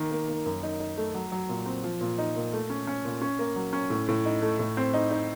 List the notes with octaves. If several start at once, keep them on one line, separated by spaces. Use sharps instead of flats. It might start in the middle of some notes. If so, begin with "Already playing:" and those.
Already playing: D#3 A#3
A#3
A#3
F#2
D#4
D#4
A3
F#3
F#3
A#2
C4
F3
A#2
D#4
A#2
A3
C#4
C#4
A#2
C#4
A#3
F#3
C#4
A2
A2
D#4
A3
A2
C4
D#4
D#4